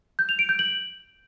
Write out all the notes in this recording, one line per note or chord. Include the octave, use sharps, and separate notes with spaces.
G6
F7
D7
G6
F#7